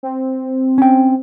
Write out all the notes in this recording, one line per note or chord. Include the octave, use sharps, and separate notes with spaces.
C4
C#4 G5